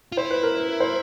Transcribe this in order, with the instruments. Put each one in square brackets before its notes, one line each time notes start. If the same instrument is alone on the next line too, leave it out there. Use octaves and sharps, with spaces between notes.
[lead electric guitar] F4
[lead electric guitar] E4 [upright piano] C5
[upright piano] B4
A#4
B4
C5